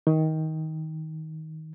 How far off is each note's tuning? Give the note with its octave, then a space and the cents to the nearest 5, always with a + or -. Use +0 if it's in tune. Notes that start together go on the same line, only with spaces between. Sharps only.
D#3 +20